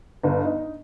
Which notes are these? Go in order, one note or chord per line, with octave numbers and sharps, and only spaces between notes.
G1
D#4